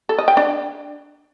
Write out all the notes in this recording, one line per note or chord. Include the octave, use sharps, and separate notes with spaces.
A4
D#5
G5
D4